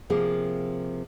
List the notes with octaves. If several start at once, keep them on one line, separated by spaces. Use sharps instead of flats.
C3 F3 A#3 G#4